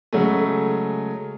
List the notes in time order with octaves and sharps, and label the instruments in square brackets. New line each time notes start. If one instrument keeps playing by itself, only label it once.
[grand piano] C#3 F#3 G#3 A3